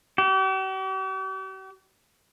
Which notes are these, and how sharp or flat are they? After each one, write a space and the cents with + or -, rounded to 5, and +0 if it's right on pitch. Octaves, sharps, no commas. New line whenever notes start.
G4 -45